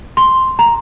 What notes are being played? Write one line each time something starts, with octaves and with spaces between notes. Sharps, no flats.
C6
A#5